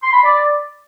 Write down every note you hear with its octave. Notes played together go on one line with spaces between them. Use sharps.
C6
B5
D5